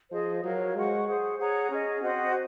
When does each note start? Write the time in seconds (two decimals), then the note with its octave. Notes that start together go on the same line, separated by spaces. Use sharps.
0.11 F3 G#4 C5 D#5
0.44 F#3 A#4 C#5 F5
0.75 G#3 C5 F#5 C#6
1.07 G#4 C5 F#5
1.38 G#4 C#5 F#5 A#5
1.70 C#4 G#4 D#5
2.01 C4 F#4 C5 D#5